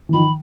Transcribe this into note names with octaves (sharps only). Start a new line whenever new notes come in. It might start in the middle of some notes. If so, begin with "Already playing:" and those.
E3
D#3 F3 B5